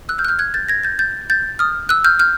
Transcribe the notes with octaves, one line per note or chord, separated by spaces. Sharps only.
E6 F#6
F6 G6
F#6
F6 G6
F#6 G#6
G6 A6
G#6 A#6
G6 A6
G6 A6
G6 A6
D#6 F6
E6 F#6
F6 G6
F6 G6